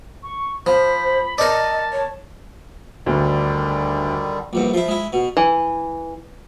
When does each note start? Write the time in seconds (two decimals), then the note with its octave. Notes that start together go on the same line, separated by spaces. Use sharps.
0.23 C#6
0.66 F3 C5 B5
1.38 A#4 D5 D#5 A5
1.92 C#5
3.06 D2 D3 D#3 G3
4.53 A#1 E2 G2
4.74 F3 E4
4.88 G#3 E4
5.13 B2
5.37 E3